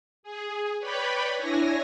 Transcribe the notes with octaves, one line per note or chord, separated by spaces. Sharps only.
G#4
B4 C#5 D5 G5 B5
D4 E4 C#5 G#5 A#6